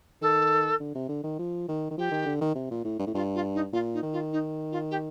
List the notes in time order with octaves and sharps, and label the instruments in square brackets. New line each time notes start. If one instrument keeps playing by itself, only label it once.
[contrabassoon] D#3 [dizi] A4
[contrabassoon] D3
C3
D3
D#3
F3
D#3
D#3
[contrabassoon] F3 [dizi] G4
[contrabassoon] D#3
D3
D#3
C3
A#2
A2
G2
A2
[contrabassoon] G2 [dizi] F4
[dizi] F4
D#4
[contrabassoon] A#2 [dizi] F4
[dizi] D#4
[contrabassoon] D#3
[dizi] F4
D#4
F4
G4